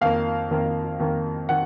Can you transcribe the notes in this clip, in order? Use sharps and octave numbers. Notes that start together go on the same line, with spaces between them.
F2 D#3 A#3 F5
F2 D#3 A#3
F2 D#3 A#3
D#3 F#5